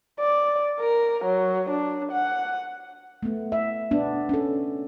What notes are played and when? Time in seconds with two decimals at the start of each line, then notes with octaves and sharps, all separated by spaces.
0.20 D5
0.80 A#4
1.25 F#3
1.70 D4
2.12 F#5
3.23 A3 B3
3.52 E5
3.91 B3 D4
4.29 C#4 A4